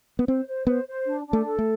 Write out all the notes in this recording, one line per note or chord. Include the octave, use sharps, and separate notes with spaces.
B3
C4 C5
C5
B3 C5
C5
D4
D4
A3
A4
A3